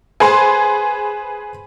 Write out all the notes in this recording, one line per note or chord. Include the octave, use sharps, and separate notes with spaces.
G#4 B4 C5 G#5 C6